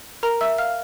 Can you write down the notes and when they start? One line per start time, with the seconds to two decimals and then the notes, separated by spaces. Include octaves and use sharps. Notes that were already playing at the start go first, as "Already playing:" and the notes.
0.23 A#4 A#5
0.41 E5 E6
0.58 F5 F6